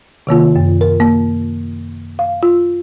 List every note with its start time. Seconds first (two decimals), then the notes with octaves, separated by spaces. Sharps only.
0.27 C3 D#3 A#3 F4
0.56 F#2
0.81 A#4
1.00 A#3
2.19 F5
2.43 F4